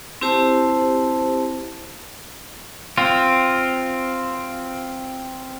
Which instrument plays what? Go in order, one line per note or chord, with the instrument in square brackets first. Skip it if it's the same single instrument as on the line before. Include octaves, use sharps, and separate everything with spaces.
[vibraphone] C4 E4 G4 C5 A5
[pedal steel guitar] C4 F4